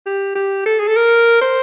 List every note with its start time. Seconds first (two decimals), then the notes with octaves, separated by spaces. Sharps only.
0.06 G4
0.35 G4
0.66 A4
0.80 G#4
0.87 A4
0.96 A#4
1.41 C5